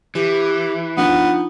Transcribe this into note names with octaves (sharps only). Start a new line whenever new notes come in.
E3 G4
F3 B3 D4 D#4 F4